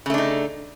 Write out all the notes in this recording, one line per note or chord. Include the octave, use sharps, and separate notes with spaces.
C#3 A3 D4 D#4